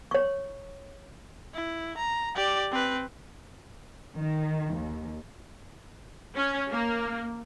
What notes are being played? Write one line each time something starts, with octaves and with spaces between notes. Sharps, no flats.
C#5 C#6
E4
A#5
G4 D5
C4 B4
D#3
D#2
C#4
A#3